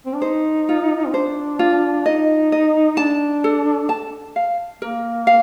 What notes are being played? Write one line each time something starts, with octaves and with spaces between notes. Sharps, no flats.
C4
D4
D#4 C5
F4
C4
D4 C5
F4
D#4 D#5
D#5
D4 A5
A4
A5
F5
A#3 A#4
F5